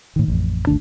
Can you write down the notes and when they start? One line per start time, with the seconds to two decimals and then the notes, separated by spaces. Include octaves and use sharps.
0.16 A2 D#3
0.28 A1 F2
0.67 G#1 D2 D3 D4